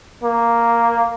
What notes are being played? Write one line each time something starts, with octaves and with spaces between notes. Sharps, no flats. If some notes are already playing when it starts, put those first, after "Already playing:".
A#3